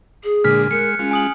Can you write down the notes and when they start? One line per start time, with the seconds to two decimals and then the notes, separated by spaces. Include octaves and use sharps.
0.24 G#4
0.44 A#2 D3 G#3 F6 B6
0.71 G#3 A#4 F#6 C#7
0.99 G#3 C#4 F4
1.11 G#5 D#6 F#7